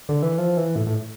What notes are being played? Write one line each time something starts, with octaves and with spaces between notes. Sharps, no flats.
D3
E3
F3
E3
A2
A2